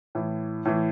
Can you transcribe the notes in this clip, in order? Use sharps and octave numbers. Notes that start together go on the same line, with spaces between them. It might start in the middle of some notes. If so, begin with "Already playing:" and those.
A2 E3
A2 E3